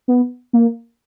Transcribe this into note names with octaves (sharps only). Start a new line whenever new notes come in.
B3
A#3